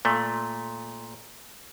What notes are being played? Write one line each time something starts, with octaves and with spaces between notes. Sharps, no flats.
A#2 A3